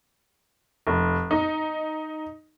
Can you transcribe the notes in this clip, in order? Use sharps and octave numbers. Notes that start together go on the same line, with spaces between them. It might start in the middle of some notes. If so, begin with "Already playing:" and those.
F1
D#4